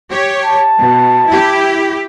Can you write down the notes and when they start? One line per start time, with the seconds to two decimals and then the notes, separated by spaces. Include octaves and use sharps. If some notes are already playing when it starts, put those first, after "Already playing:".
0.11 G4 C#5
0.45 A5
0.78 B2
1.29 E4 G4